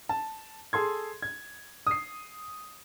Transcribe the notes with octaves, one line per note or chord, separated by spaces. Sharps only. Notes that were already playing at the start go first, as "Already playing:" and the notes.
A5
G#4 A4 C6 G#6
G#6
D#6 C7